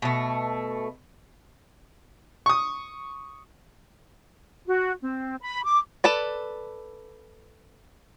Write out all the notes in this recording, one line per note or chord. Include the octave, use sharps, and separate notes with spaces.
B2 A3
C#6 D#6
F#4
C4
B5
D6
A4 B4 D5